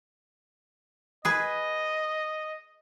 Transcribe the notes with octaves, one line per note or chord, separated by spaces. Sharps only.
G#4 B4 D#5